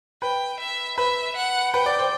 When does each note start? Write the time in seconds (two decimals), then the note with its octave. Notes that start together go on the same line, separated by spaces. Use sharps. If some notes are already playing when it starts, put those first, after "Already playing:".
0.22 B4 G5
0.60 E5
0.98 B4 E5
1.36 F#5
1.73 B4 G5
1.86 D5
1.99 C5